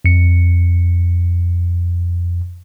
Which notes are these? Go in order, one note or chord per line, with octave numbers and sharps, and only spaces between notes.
F2 C#7